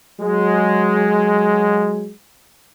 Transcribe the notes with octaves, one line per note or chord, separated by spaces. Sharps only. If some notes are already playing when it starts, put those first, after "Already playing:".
F#3 G#3